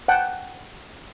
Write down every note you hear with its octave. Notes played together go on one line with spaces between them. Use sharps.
F#5 G5 A5